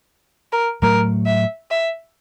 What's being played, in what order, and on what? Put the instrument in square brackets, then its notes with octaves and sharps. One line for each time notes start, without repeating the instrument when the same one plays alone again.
[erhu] A#4
[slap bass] A2 F#3 A3 [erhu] A#4
[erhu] E5
E5